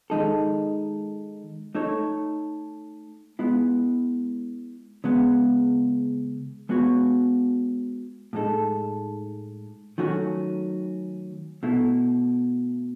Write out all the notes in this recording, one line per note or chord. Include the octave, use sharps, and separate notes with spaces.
D#3 G#3 D#4 A4
A3 D#4 A4 C#5
G#3 B3 E4
C#3 G#3 B3
G#3 B3 F#4 C#5
A2 G#3 D#4 A4
D#3 F#3 A3 C#4 F#4
B2 A3 E4